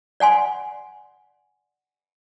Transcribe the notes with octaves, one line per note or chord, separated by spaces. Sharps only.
D5 F#5 G#5 C6